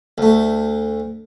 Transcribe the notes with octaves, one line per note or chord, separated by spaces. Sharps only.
D2 A3